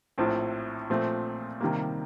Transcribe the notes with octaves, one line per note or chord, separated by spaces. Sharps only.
A#1 A2 F3 C4
A#2 F3 A3 C4
C3 D#3 G3 A#3